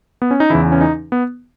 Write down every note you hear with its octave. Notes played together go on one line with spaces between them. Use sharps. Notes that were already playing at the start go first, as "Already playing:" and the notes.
B3
C#4
D#4
E2 C#3 E3 E4
C#4
D#4
B3